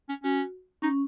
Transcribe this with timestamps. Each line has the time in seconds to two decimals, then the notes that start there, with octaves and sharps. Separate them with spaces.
0.09 C#4
0.23 C#4 F#4
0.82 C#4 D#4